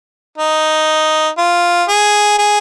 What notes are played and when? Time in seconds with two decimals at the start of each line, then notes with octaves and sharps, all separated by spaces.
0.38 D#4
1.38 F4
1.88 G#4
2.38 G#4